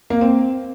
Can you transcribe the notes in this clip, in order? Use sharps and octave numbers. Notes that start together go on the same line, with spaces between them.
A#3
C4